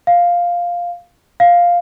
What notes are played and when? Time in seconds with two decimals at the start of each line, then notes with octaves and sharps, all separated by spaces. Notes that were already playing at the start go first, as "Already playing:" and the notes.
0.07 F5
1.40 F5